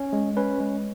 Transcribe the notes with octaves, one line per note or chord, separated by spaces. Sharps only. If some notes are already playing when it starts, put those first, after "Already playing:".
Already playing: C#4
G#3
C#4 B4
G#3